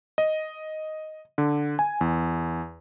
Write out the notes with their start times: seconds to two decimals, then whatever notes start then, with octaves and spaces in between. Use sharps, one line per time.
0.18 D#5
1.38 D3
1.79 G#5
2.01 E2